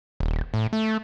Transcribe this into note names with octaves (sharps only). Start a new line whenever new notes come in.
D#1
A2
A3